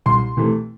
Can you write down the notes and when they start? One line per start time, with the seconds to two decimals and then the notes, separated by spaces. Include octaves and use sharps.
0.06 C2 C6
0.37 C3 E3 A3